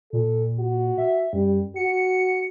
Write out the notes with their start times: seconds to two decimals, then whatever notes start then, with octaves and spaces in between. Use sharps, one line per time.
0.13 A#2 A4
0.59 F#4
0.98 E5
1.33 F#2 G3
1.76 F#4 C#7